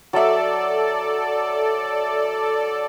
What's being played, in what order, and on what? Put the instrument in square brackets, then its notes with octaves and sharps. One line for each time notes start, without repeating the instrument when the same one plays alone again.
[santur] F#3 E5 [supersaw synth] A4 D5